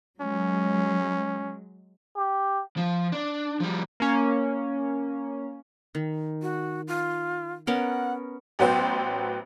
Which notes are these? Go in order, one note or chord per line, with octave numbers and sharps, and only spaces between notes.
F#3 G#3 C#4
G4
F3
D4
F3 G3
A#3 C#4
D#3
F#4
F4
B3 C#4 A#4 F#5
A1 F#3 B3 C5 G5